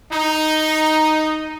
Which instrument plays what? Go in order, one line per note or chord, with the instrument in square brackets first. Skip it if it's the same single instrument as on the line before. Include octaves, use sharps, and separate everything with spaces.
[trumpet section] D#4